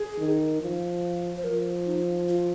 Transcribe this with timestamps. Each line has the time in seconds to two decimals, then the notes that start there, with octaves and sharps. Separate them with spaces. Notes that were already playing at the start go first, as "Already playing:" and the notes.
Already playing: G#4
0.18 D#3
0.61 F3
1.37 C5
1.44 F3 A#4
1.86 D#4
2.28 F4